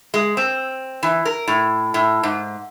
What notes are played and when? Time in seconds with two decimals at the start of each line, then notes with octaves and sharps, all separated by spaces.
0.14 G#3
0.37 C4
1.03 E3
1.25 A#4
1.48 A2
1.94 A2
2.23 G#2